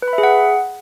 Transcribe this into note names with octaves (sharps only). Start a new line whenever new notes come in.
B4
B5
E5
G#4
F#5